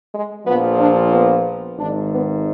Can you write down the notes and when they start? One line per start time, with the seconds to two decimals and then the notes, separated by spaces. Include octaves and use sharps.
0.13 G#3
0.45 A#1 A#2 F3 B3
0.79 D4
1.12 B3
1.78 G#1 G#2 D#3 D4
2.11 B3